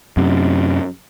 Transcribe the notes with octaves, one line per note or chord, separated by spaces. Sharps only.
F#2 C3